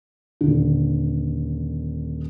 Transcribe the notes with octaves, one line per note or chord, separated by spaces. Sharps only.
D#1 D3